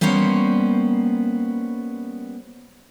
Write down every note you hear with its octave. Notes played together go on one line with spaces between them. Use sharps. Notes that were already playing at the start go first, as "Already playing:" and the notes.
G3 A#3 B3 C#4 C5